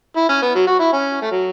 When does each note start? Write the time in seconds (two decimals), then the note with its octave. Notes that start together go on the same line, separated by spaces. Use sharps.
0.16 E4
0.29 C#4
0.42 B3
0.55 F#3
0.67 F#4
0.80 E4
0.93 C#4
1.22 A3
1.31 F#3